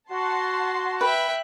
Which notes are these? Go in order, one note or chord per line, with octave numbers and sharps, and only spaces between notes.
F#4 F#5 A5 C6
B4 E5 G5 F#6